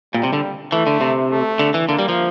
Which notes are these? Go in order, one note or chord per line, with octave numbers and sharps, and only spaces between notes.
A#2 G3
C3
D3
E3 A3
D3
C3
A3
D3
E3
D3 A#3
G3
F3